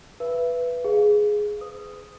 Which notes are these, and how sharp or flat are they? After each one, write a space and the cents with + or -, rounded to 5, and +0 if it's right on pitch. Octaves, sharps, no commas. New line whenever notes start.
B4 +0 E5 +35
G#4 +5 F5 +0
B4 +40 D#6 +0